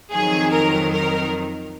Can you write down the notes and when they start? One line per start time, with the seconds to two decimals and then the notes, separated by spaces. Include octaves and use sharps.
0.12 F2 D#3 F#3 G#4
0.52 A#4
0.92 A#4